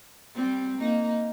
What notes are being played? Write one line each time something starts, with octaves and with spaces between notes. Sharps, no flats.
G3 C4
A#3 D#4